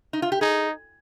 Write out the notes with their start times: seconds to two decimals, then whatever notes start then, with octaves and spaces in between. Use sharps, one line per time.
0.13 D#4
0.22 F4
0.32 G4
0.41 D#4 G#4